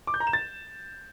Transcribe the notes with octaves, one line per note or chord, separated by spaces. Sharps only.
D6
G6
A#5
E7
A6